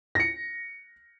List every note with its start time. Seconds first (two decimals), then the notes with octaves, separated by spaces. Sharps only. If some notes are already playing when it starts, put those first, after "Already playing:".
0.15 A#6 C#7